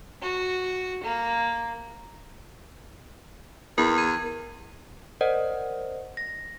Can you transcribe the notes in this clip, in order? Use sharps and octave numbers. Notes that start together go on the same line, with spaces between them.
F#4
A#3
E2 A#4
G#6 D#7
A#4 C5 D5 D#5 F#5
A#6